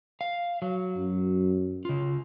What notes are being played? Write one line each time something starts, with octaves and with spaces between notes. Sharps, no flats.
F5
F#3
F#2
C#3 F4